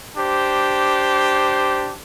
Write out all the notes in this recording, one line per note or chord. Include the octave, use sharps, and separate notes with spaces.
D4 G4 C5